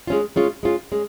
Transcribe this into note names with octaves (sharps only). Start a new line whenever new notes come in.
G#3 C#4 F4
G#3 C#4 F4
G#3 C#4 F4
G#3 C#4